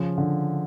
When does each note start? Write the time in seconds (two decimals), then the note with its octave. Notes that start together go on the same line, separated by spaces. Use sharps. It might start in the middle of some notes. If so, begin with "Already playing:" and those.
Already playing: C#3 F3
0.18 D3